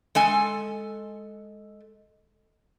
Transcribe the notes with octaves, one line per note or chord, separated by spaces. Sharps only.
G#3 A4 G#5